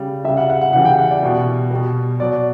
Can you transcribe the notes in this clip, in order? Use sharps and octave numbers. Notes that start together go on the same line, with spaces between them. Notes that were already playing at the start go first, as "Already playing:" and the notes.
Already playing: C#3 G3
C#3 G3 E5
F#5
F#5
F#5
C#3 E3 G3 F#5
G5
F#5
D5
B2 G3
B2 G3
B2 F#3 D5